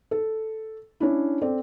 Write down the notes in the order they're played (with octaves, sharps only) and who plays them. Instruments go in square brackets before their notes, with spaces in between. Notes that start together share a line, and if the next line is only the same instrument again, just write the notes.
[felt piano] A4
C#4 D4 E4
C4 A4 D5